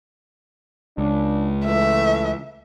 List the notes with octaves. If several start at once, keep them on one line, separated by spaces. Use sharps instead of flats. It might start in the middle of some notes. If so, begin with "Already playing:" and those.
C#2 D4
E3 A3 E5